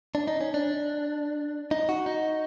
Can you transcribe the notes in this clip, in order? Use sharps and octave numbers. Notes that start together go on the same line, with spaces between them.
D4
D#4
C#4
D4
D#4
F#4
D#4